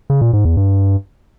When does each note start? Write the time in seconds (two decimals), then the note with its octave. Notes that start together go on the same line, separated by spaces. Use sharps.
0.10 C#3
0.21 A#2
0.33 G#2
0.45 E2
0.57 G2